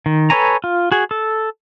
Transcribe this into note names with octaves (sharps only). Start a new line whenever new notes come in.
D#3
A4 B4 C#5 G#5 A#5
F4
F#4 G#4
A4